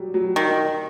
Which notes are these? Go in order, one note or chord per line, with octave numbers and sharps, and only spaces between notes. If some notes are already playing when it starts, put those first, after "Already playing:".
Already playing: F#3 G3
F#3
D#3